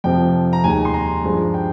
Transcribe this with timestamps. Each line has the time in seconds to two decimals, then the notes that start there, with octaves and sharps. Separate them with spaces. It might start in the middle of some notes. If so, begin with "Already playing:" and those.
0.04 F2 C3 F3 G5
0.53 A#5
0.64 D#2 D#3 G#3 G#5
0.85 C6
0.94 A#5
1.24 G2 F3 G#3
1.54 G5